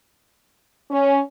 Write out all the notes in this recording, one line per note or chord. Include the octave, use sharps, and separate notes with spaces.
C#4